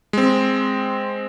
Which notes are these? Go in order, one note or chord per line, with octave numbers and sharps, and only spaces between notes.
G#3 C4